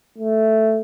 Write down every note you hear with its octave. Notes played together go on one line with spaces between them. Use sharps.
A3